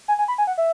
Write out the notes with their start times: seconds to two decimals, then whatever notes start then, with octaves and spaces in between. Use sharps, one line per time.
0.08 G#5
0.19 G#5
0.28 B5
0.38 G#5
0.47 F#5
0.58 E5